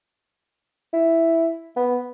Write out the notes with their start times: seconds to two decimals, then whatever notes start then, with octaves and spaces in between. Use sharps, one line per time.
0.93 E4
1.76 B3